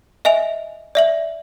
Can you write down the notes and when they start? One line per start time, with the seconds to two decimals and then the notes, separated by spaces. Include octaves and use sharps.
0.25 D#5 E5 G#5 F7
0.95 D5 E5 F#7